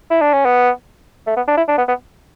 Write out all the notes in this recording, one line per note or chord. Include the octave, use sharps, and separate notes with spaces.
E4
D4
C#4
B3
A3
B3
D4
E4
D4
B3
B3